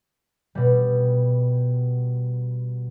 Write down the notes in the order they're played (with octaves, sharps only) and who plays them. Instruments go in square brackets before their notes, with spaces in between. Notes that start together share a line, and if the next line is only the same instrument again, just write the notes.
[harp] B2 G3